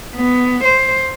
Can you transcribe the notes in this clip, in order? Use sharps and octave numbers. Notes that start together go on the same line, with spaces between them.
B3
C5